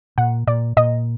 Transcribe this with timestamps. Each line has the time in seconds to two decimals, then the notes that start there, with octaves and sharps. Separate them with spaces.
0.18 A#2 F#5
0.47 A#2 D5
0.77 A#2 D#5